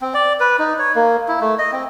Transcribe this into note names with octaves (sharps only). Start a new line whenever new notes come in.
C4
D5
B4
D#4
C#5
A#3
E4
A3
D#5
C4